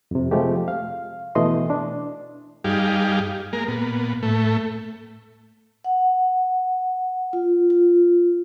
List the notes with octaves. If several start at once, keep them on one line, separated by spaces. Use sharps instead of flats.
F2 C3
C3 F3 G#3 A3 G4
F5
B2 E3 A3 D#5 C6
D4
G2 G3 D#4 G4 G#4 F5
G#3 A#3 A#4
A#2 B3
A2 A3
F#5
F4
F4